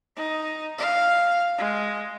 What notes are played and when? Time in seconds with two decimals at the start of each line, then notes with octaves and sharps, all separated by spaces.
0.16 D#4
0.78 F5
1.58 G#3